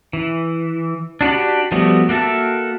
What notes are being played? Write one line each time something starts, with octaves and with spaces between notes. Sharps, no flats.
E3
D4 F#4 G4 B5
F3 G3 A3 B3 F#4
A#3 F#4 A4 E5 A5